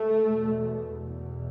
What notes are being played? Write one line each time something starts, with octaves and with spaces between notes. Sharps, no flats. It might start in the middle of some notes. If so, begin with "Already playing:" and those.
Already playing: A3
E2 B2
E2 B2